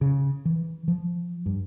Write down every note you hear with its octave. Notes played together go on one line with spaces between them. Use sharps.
C#3
E3
F3
G2